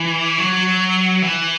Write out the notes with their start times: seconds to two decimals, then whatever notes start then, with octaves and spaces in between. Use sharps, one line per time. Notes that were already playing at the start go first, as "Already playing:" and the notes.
Already playing: E3
0.38 F#3
1.22 E3